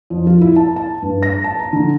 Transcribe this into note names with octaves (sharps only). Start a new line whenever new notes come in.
F2
F4
E4
A5
A5
G2
A#6
A5
A#5
D3